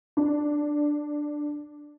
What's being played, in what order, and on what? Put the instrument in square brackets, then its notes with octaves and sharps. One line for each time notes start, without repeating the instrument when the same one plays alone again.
[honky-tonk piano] D4 D5